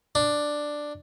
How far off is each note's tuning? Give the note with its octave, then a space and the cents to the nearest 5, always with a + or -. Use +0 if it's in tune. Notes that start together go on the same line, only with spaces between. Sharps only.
D4 +5